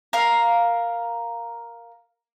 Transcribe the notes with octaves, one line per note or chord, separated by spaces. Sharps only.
A#4 F5